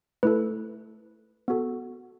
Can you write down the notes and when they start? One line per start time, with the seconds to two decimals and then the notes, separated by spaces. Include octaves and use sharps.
0.23 A3 E4 A4 B4
1.48 B3 F#4 A4